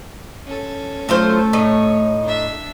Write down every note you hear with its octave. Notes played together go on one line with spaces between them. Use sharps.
C#4 A4
F#3 A3 F4 C5
A2 D#4 C#5
D4 E5